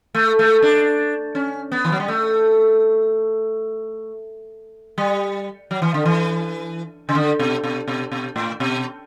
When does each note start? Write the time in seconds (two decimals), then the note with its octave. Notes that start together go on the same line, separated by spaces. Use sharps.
0.15 A3
0.39 A3
0.62 D4
1.35 C#4
1.72 B3
1.85 E3
1.92 F#3
2.00 G3
2.08 A3
4.98 G3
5.71 F#3
5.82 E3
5.94 D3
6.05 E3
7.09 C#3
7.15 D3
7.39 B2
7.64 B2
7.88 B2
8.12 B2
8.36 A2
8.60 B2